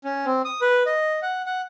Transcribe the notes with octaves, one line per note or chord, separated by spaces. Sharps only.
C#4
C4
D#6
B4
D#5
F#5
F#5